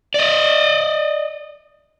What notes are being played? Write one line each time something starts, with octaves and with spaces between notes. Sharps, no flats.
D5 D#5